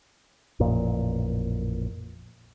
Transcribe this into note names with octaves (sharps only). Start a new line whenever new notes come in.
A1 F2 A#2